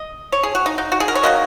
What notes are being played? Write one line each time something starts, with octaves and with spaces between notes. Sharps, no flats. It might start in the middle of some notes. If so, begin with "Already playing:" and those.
Already playing: D#5
C#5
G#4
F#4
D#4
D#4
F#4
G#4
A#4
C#5
D#3 F#3 A#3 D#5